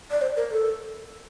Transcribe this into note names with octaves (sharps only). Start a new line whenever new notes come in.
D5
C5
A#4
A4